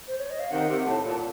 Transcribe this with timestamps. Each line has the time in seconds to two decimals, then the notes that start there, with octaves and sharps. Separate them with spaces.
0.08 C5
0.18 C#5
0.30 D#5
0.40 F5
0.50 C3 D#3 F#5
0.68 C3
0.86 A2 A5
1.04 A#2 A5